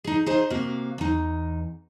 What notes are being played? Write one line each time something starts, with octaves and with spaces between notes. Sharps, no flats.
D#4 G#4
D#4 G#4 C5 D#5
C3 A#3 F#4 F5
E2 D#4